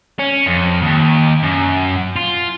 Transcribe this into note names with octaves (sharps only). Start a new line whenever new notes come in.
C#4
F2
D#2
F#2
F4